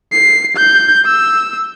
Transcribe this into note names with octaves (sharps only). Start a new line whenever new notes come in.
C7
G6
E6